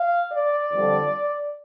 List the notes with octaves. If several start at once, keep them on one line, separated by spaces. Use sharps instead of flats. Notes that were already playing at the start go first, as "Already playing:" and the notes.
Already playing: F5
D5
F2 D3 G3